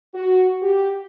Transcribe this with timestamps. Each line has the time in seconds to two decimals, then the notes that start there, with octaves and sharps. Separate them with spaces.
0.14 F#4
0.62 G4